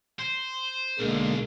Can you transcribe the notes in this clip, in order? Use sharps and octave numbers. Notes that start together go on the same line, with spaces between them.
C5
B1 D3 G#3 A#3